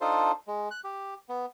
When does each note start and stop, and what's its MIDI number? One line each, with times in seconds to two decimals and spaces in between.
0.01 0.32 62
0.01 0.32 63
0.01 0.32 65
0.01 0.32 69
0.01 0.32 72
0.47 0.69 56
0.71 0.80 90
0.84 1.14 67
1.29 1.46 59